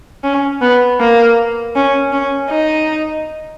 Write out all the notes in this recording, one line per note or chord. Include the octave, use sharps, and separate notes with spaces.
C#4
B3
A#3
C#4
C#4
D#4